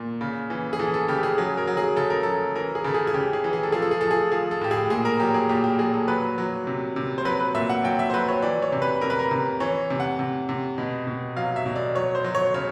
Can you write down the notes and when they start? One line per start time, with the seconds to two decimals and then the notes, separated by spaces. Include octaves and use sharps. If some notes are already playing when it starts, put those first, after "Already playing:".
Already playing: A#2
0.21 C#3
0.50 E3
0.73 G#4
0.79 E3 A4
0.94 A4
1.08 C#3 G4
1.23 G#4
1.38 F#3 G#4
1.58 A#4
1.67 F#3
1.77 G#4
1.96 C#3 A4
2.10 A#4
2.23 F#3 A4
2.56 E3 A#4
2.75 G#4
2.84 C#3 A4
2.94 G#4
3.07 G#4
3.14 C#3 G4
3.33 G#4
3.44 E3
3.53 G#4
3.63 A4
3.72 F3 G#4
3.82 A4
3.91 G#4
4.01 F3 A4
4.11 G#4
4.32 F3 G#4
4.51 A4
4.61 A2 G4
4.71 G#4
4.90 A#2 G#4
5.05 A#4
5.20 F#3 G4
5.34 G#4
5.49 A#2 G4
5.64 G4
5.79 F#3 G#4
5.94 A4
6.08 F#3 B4
6.38 F#3
6.67 C3
6.96 C3
7.18 C5
7.25 F#3 B4
7.40 B4
7.54 A#2 E5
7.70 F#5
7.84 F#3 G5
7.99 E5
8.10 C5
8.14 F#3 B4
8.28 C#5
8.42 E3 D5
8.62 C#5
8.72 C3
8.82 B4
9.01 C3 A#4
9.10 B4
9.19 A#4
9.31 C3
9.60 E3 C#5
9.90 C3
10.00 F#5
10.19 C3
10.49 C3
10.78 B2
11.07 B2
11.36 F#3 F5
11.56 E5
11.66 B2
11.76 D5
11.95 F#3 C#5
12.15 C5
12.24 F#3
12.35 C#5
12.54 C#3 C#5